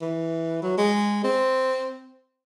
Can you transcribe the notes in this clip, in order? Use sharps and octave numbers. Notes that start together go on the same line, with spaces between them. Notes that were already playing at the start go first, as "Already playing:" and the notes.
E3
F#3
G#3
C4